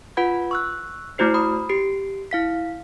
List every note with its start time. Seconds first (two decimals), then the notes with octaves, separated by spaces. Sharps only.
0.17 F4 B4 F#5 B5 G#6
0.51 C#6 E6 F#6
1.18 A3 E4 F#4 C5 C7
1.34 B5 D#6
1.69 G4 C7 D7
2.31 E4 F5 B6